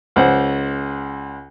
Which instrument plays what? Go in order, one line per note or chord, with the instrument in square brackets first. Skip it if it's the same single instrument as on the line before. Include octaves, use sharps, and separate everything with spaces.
[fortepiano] C#2 C5 F#5